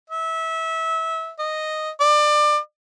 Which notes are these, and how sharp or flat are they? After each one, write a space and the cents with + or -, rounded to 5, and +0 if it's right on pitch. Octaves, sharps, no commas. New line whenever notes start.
E5 -25
D#5 -5
D5 +25